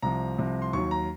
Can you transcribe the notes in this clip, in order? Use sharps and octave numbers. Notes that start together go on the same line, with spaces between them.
C2 C3 F3 A#5
C2 C3 F3
C6
D#2 D#3 F#3 C#6
A#5